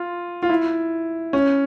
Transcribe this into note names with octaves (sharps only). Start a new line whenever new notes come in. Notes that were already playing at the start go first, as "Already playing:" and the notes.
Already playing: F4
F4
E4
C#4